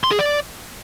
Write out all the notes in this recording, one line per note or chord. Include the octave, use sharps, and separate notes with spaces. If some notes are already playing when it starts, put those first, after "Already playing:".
C6
G#4
D5